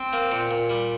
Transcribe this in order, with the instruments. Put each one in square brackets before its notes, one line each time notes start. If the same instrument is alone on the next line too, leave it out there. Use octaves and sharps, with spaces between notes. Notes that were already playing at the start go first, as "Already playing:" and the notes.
Already playing: [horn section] C4
[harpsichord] A#3
A#2
A#2
G3